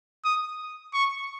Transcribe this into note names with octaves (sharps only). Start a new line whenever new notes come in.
D#6
C#6